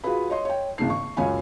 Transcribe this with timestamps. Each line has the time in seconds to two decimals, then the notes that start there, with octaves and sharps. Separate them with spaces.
0.04 F4 F#4 G#4 B4 B5
0.30 C#5 D#5 C6
0.45 C#5 G5
0.78 G#1 C#3 E3 A#3 D4 C7
0.90 C#6
1.17 C#2 F#2 C#5 F5 G#5 B5